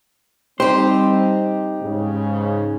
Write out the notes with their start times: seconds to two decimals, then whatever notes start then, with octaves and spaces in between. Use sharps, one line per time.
0.60 G3 C4 D#4 G4 C5
1.81 G#2 C#3